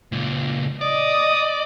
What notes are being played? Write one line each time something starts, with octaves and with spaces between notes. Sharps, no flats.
C#2 A#2
D5 D#5 D6 D#6